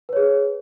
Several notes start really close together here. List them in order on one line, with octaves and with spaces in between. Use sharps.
B4 C#5 G#4